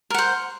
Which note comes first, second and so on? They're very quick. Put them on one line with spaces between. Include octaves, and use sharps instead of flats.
A#4 F#5 C5